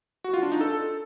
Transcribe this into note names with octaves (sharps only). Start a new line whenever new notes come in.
F#4
F4
D4
D#4
A4